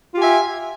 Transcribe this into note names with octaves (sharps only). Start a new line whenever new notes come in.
F4 G4 E5 G#5